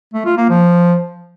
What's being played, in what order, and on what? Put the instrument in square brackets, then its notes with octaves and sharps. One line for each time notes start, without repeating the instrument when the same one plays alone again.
[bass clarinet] A3
F4
A#3
F3